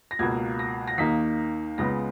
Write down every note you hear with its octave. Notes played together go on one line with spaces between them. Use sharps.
A#6
C#2 B2 A#3 G#6
A#6
A#6
D#2 D#3 A#3 D#4 B6
C#2 C#3 G#3 B3 A#6